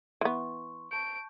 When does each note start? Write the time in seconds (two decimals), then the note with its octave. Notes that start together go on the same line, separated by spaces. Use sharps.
0.21 E3 B3 C6 C#6
0.91 A5 C#6 G6 D7